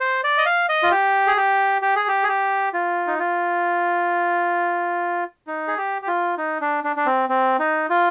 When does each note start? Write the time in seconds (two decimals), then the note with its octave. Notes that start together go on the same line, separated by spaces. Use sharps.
0.01 C5
0.24 D5
0.38 D#5
0.46 F5
0.69 D#5
0.83 F4
0.91 G4
1.27 G#4
1.37 G4
1.82 G4
1.96 G#4
2.08 G4
2.23 G#4
2.28 G4
2.73 F4
3.07 D#4
3.19 F4
5.47 D#4
5.68 G#4
5.77 G4
6.02 G4
6.08 F4
6.38 D#4
6.61 D4
6.84 D4
6.96 D4
7.06 C4
7.29 C4
7.59 D#4
7.90 F4